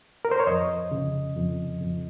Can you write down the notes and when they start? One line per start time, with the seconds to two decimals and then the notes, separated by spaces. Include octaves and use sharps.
0.25 A#4
0.31 C5
0.40 C#5
0.47 F2 D#5
0.92 C#3
1.36 F2
1.81 F2